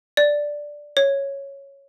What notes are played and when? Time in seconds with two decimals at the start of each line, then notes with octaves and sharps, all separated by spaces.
0.17 D5
0.97 C#5